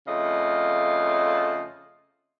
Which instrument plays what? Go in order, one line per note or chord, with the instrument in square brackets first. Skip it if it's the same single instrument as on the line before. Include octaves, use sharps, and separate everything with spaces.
[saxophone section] F2 C#3 A3 D#5 F5